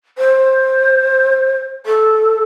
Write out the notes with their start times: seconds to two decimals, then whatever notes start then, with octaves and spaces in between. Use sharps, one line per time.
0.18 C5
1.86 A4